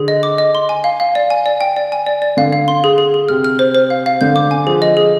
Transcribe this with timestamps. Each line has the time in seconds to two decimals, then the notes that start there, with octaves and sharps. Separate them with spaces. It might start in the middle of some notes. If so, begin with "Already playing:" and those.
Already playing: D3 G#4
0.08 D#5
0.23 D6
0.38 D#5
0.55 C6
0.69 G#5
0.84 F5
1.00 F5
1.15 D5
1.30 G#5
1.46 D5
1.61 G5
1.76 D5
1.92 G#5
2.06 D5
2.22 D5
2.37 D3 F5
2.53 F5
2.68 C6
2.84 G#4
2.98 G#4
3.14 G#4
3.29 C3 F6
3.44 F6
3.59 C5
3.75 C5
3.90 F5
4.06 F5
4.21 D3 G6
4.36 D6
4.51 G#5
4.66 F3 G#4
4.82 D#5
4.97 G#4